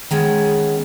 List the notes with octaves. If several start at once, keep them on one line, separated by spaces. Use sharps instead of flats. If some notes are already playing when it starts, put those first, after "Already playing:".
D#3 G#3 B3 C#4